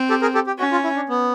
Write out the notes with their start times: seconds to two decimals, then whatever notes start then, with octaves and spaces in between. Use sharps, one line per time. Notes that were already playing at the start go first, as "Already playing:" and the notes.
Already playing: C4
0.10 G4 A4
0.22 G#4 A#4
0.34 G4 A4
0.47 G4
0.59 C#4 F#4
0.72 F4
0.84 E4
0.96 D4
1.09 B3